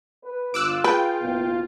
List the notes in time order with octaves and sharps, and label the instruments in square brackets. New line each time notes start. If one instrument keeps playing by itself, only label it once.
[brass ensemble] B4
[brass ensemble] G1 [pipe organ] F4 [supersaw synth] D6 E6 F#6
[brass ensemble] G#4 [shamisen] B4 [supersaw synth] G5
[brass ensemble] F#1 B2 B3